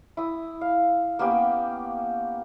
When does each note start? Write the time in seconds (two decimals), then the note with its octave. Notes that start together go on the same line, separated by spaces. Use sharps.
0.17 E4 D#6
0.61 F5
1.19 A#3 B3 C#4 G4